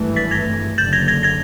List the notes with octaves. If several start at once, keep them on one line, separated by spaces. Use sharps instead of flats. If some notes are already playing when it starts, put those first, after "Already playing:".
Already playing: G#1 G2 E3 A3
A6 B6
G#6 A#6
F#1 F#2 D3 G6 A6
G#6 A#6
G#6 A#6
G#6 A#6